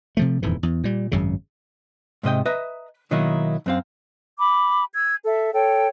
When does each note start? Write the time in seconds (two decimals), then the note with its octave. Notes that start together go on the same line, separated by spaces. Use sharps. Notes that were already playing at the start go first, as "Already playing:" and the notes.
0.17 C3 F3 A3
0.43 D#1 F2 G#2 E3
0.63 E2
0.84 A#2 G3
1.12 G#1 F#2 C#3
2.23 G#2 C3 D#5 G5
2.46 B4 D#5 E5 A#5
3.11 B2 D#3 F#3 A#3 D#4 E4
3.66 F#2 C4 F5
4.38 B5 D6
4.94 E6 G#6
5.25 A4 E5
5.53 A4 C#5 G5